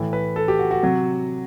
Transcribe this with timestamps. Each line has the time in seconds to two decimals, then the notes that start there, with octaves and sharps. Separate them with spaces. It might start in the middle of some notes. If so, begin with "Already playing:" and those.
Already playing: A2 E3
0.13 B4
0.36 A4
0.48 G4
0.59 F#4
0.71 F#4
0.83 C3 F#3